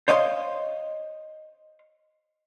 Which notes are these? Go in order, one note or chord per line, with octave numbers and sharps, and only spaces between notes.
C5 C#5 D#5 F5 C6